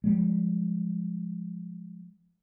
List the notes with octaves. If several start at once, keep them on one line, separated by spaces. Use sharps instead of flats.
F3 G3 G#3